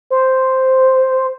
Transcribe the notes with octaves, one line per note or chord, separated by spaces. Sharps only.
C5